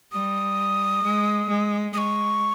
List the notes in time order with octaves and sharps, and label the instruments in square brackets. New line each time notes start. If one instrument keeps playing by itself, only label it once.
[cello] G3 [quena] D#6
[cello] G#3
G#3
[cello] G#3 [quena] C#6 D#6